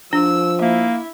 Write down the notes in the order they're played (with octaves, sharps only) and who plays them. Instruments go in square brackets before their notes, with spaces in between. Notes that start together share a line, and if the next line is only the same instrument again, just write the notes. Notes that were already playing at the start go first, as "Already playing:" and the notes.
[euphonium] F3 [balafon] D4 [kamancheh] E6
[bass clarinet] A#3 [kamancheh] E4 E5